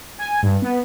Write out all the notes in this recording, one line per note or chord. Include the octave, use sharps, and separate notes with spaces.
G#5
G2
B3